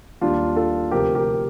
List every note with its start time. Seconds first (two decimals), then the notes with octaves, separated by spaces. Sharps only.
0.21 D#2 D#3 G3 D4 F4
0.56 F4 A4
0.91 D2 C3 F3 G4 A#4
1.15 G4 A#4